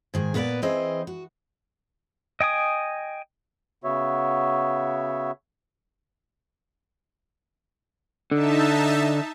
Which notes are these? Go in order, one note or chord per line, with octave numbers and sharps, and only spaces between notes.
G#2 D#3 G#4
A#2 B3 B4 C5 D5
E3 C4 G#4 D#5
F#4
D#5 G5 G#5 D#6
C#3 B3 F#4 C#5 E5
D3 D#4 E5 A5